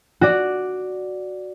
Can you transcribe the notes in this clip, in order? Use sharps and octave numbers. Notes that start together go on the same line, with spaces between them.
F#4 D5